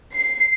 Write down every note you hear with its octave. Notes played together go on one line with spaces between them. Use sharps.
C7